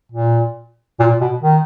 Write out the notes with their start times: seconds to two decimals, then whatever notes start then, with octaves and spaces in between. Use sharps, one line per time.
0.12 A#2
0.99 A#2
1.10 A#2
1.21 B2
1.43 D#3